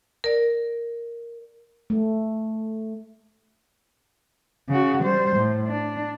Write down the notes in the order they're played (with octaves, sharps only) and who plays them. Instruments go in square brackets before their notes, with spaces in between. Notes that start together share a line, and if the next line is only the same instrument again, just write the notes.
[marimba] A#4 D5
[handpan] A3
[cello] C#3 F#4
G3 C5
A2
D4